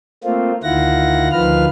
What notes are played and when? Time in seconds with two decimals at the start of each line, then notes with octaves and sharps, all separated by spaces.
0.24 A3 A#3 C4 F4
0.63 D2 D#3 E4 F4 F#5 A#6
1.32 D2 D#3 F3 F4 B4 F6